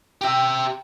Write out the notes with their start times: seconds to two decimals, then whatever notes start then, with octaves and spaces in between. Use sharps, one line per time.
0.21 G4 E5 G5 A#5